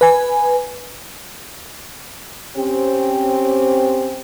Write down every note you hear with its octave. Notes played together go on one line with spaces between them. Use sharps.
B4 G#5
C4 C#4 G4